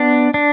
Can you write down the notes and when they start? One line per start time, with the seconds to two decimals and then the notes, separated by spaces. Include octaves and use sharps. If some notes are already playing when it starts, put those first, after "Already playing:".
Already playing: B3 D4
0.34 D4